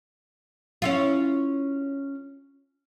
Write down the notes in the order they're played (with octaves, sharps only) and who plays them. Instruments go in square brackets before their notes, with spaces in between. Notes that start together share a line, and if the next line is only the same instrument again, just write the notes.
[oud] C#4 E4 F4